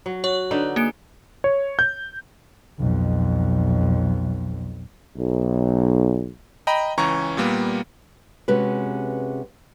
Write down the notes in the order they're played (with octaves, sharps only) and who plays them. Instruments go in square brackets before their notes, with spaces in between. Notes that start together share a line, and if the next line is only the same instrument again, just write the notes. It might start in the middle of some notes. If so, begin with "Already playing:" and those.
[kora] F#3
[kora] F#4 [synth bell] C#5
[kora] D3 D#4 B4
[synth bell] A#3 C#7 D7 [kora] G#4
[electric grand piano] C#5
G6
[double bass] B1 F2
[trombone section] B1
[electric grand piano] D#5 G5 A#5 B5
C#2 E3 C#4 A#5 C#6
A#2 G3 A#3 B3
[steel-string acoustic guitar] C3 G#3 C#4 F#4 B4